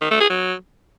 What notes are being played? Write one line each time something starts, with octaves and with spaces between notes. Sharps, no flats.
D#3
A3
G#4
F#3